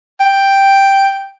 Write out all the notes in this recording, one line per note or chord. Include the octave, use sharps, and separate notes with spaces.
G5